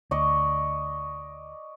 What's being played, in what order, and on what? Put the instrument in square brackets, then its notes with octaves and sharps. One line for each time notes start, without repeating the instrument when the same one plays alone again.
[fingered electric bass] D2 [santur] D5 D#5 C#6